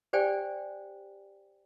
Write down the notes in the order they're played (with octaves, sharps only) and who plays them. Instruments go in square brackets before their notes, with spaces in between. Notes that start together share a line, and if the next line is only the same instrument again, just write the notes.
[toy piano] G4 C5 D5 G5 G#5